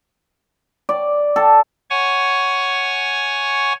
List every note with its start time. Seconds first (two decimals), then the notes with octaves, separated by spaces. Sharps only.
0.89 D5
1.36 A4
1.90 C#5 F#5 G#5 C#6